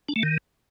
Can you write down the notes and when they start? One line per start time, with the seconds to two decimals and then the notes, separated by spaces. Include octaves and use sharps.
0.09 D4
0.16 A3
0.23 D#3